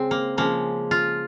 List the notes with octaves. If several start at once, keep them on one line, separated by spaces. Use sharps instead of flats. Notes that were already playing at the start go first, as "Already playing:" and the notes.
Already playing: C#3 G#3 C4
A#3
C#3 F3 G#3 A#3
F4